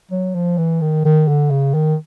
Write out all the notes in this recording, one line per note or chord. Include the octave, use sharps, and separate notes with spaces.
F#3
F3
E3
D#3
D#3
D3
C#3
D#3